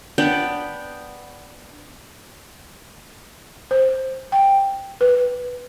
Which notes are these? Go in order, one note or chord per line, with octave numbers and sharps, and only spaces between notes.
B3 D4 G5
C5
G5
B4